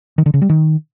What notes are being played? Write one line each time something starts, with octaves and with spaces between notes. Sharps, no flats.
D#3
D3
C#3
G3
D#3